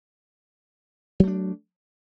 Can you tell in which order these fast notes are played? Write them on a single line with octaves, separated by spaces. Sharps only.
F#3 A3 D4